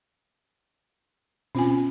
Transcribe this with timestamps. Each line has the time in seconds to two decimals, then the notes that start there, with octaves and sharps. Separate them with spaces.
1.55 B2 C4 C#4 F4 G#5